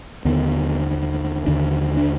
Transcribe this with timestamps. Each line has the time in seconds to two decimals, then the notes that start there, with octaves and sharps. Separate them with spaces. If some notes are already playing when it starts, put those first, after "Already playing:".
0.25 D#2 D3 B3
1.47 D#2 D3 D4
1.97 D4